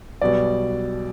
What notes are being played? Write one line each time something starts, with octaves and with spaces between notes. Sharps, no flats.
B1 B2 G3 D5